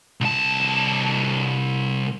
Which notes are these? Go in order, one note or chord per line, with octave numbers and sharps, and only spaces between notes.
C2 A5